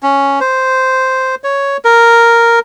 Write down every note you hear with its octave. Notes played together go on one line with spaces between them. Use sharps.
C#4
C5
C#5
A#4